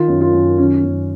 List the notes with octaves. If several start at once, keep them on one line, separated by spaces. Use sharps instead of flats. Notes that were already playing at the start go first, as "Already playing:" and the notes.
Already playing: D#3 F4
F#2
F4
F#2
D#3 C#4
F#2